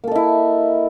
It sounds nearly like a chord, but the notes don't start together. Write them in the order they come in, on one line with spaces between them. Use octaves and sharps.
A#3 A4 D#5 E4